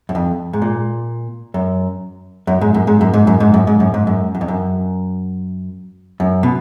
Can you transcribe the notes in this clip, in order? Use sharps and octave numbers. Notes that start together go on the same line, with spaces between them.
F#2
F2
G#2
A#2
F#2
F#2
G#2
F#2
G#2
F#2
G#2
F#2
G#2
F#2
G#2
F#2
G#2
F#2
F#2
F2
F#2
F#2
B2